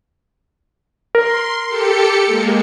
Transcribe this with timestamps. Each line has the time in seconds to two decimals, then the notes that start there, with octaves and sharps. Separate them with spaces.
1.15 A#4 C6
1.68 G4 A4 C#7
2.26 G#3 A#3